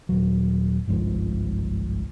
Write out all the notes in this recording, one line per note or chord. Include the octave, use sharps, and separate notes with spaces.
D#1 F#3
G1 C2 G#2 F3